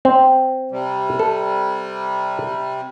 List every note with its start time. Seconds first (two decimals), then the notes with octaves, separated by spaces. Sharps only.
0.05 C4
0.71 C3 G3
1.19 A4